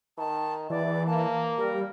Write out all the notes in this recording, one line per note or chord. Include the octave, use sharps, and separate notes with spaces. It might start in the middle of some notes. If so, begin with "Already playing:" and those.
D#3 A5
E2 E3 D5
A#3 A5
G3 A#4